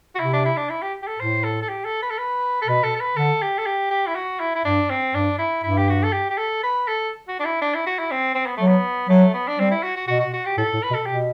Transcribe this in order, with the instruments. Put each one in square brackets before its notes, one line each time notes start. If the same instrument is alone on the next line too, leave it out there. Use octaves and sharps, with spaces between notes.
[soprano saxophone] F#4
[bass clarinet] C3 [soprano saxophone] E4
[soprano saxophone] D4
E4
D4
E4
G4
G4
A4
[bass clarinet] A2 [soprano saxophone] C5
[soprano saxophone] A4
A4
G4
A4
B4
A4
B4
A4
[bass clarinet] B2 [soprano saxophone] B4
[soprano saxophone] A4
A4
B4
[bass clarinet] D3 [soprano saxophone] A4
[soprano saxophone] G4
A4
G4
G4
E4
F#4
E4
E4
[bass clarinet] G2 [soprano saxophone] D4
[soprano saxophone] C4
[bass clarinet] G2 [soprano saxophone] D4
[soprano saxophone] E4
[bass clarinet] G2 [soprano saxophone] E4
[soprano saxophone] G4
F#4
A4
G4
G4
A4
B4
A4
F#4
D4
E4
D4
E4
F#4
E4
C4
C4
B3
[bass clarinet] F#3 [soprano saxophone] A3
[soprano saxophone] B3
[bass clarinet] F#3 [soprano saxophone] A3
[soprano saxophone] B3
D4
[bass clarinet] G3 [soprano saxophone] C4
[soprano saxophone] E4
F#4
F#4
[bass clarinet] B2 [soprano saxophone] F#4
[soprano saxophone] F#4
F#4
G4
[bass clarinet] A2 [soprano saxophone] A4
[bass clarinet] A2
[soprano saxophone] B4
[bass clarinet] B2
[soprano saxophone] A4
[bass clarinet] B2 [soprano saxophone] G4